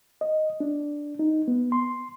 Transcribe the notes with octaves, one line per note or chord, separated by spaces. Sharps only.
D#5
D4
D#4
B3
C6